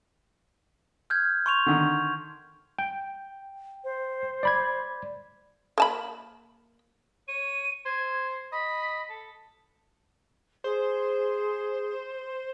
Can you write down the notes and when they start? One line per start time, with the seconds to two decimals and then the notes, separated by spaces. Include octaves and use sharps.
1.10 F6 G6 G#6
1.46 C6 C#6 F7
1.66 D3 D#3
2.79 G5
3.84 C5
4.43 D5 B5 G#6
5.78 A#3 A5 B5
7.28 C#5 D#7
7.86 C5 G#6
8.52 D#5 B5
9.09 A4
10.64 G#4 C5